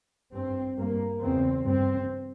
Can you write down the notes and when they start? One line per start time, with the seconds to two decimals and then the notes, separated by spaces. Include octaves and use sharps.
0.33 G2 C4
0.77 G2 A#3
1.21 E2 C#3 C4
1.65 G2 C4